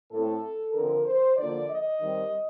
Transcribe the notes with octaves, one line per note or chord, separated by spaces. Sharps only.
A2 A3 C4 A4
D3 F3 C4 A#4
C5
D3 F3 A#3 D5
D#5
D#3 G3 C4